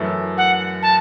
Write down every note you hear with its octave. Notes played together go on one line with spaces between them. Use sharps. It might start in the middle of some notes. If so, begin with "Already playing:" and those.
Already playing: F#2 E3 A3
F#5
A5